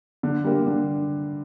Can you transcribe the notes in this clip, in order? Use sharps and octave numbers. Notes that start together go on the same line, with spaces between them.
D3
G3 A#3
D3